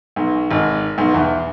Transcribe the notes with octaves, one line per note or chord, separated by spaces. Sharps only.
B1
G#1
B1
E2